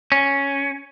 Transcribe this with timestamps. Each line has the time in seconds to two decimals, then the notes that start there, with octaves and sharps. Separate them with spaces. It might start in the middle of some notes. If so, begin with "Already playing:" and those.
0.12 C#4